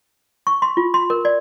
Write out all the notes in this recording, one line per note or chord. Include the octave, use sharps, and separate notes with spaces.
C#6
C6
F4
C6
A#4
D5